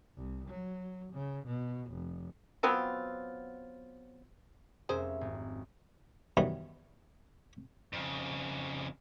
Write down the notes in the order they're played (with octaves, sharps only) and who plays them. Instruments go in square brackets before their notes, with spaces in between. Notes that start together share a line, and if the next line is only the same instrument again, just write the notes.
[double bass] C2
F#3
C#3
B2
F1
[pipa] F#3 B3 C4 F4
[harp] F1 C#4 E5 [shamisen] G#4 A#4 C5
[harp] G#1
[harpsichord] F#2 D#3 E3 G3 B3
[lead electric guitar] F2 C#3